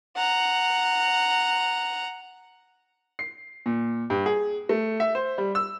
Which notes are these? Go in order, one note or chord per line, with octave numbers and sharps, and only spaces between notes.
F#5 A#5
C7
A#2
G2
G#4
A3
E5
C5
G3
E6